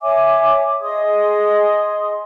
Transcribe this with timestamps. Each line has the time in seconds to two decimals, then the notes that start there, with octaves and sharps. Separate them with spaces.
0.01 C#5 E5 G#5 D6
0.81 G#4 D#5 C6 D#6